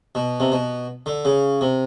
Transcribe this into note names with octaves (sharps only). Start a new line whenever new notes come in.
B2
C3
B2
D3
C#3
C3